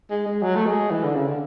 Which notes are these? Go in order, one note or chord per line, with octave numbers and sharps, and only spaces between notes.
G#3
G#3
F#3
A3
G#3
E3
D3
C#3
D3